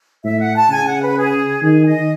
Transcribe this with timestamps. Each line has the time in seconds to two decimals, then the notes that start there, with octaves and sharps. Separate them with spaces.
0.24 A2 E5
0.39 F#5
0.56 A5
0.70 C#3 G#5
0.86 F#5
1.02 B4
1.17 G#4
1.63 D#3 G#4
1.86 D#5